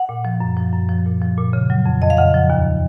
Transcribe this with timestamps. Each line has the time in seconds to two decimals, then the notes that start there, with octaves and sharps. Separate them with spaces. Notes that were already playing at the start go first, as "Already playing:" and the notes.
Already playing: F#5
0.09 A#2
0.25 F3
0.40 F#2
0.57 F3
0.73 F#2
0.89 F3
1.06 A#2
1.22 F3
1.38 A#2
1.53 C#3
1.70 F#3
1.86 F2
2.02 F2 D#5
2.10 F5
2.17 C#3 F#5
2.34 F3
2.50 D#2